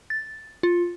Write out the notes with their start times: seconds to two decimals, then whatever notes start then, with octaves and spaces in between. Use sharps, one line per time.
0.10 A6
0.63 F4